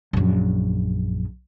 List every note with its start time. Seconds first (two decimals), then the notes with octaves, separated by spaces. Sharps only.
0.13 A#1 F#2